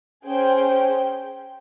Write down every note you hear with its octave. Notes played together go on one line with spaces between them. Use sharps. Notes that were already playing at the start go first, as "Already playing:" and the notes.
C#4 G#4 C5 G5